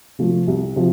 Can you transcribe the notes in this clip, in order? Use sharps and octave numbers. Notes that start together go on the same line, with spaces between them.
C3 F3 A3
C2
C3 F3